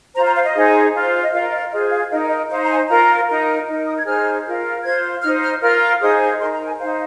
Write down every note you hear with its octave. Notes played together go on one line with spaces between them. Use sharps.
F4 C5 A#5
A#5
F5
D#5
D#4 G#4 C5
F4 C5
D#5
F4 A#4 F5
D#5
F4 G#4 C5 D#5
F5
D#4 A#4 D#5
D#5
D#4 C5 F5
A#5
G#5
F4 A#4 A#5
D#4 A#4
D#4 A#4
D#6
G#6
D#4 G#4 C5 F6
F4 A#4
F4 C5 G#6
D#4 C5 F6
F6
F4 A#4 F6
D#4 G#4 C5 D#6
D#4 A#4 C6
A#5
G#5
D#4 C5 F5